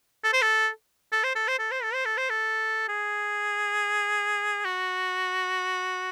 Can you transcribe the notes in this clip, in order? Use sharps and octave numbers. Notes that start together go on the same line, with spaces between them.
A4
C5
A4
A4
C5
A4
C5
A4
C5
A4
C5
A4
C5
A4
G#4
F#4